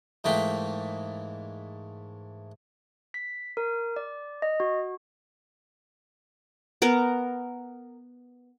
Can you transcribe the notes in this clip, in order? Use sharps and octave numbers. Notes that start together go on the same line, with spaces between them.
G#2 E3 A3 A#3 E5 G5
B6
A#4
D5
D#5
F#4
B3 A#4